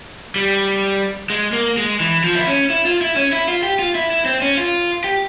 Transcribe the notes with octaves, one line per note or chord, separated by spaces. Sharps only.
G3
G#3
A#3
G#3
E3
F3
E4
C#4
E4
F4
E4
C#4
E4
F4
G4
F4
E4
E4
C4
C#4
F4
G4